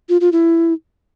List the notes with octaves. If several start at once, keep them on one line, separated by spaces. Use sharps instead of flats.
F4
F4
E4